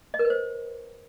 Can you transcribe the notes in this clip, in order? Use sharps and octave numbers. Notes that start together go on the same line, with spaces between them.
D#5
A#4
B4
C5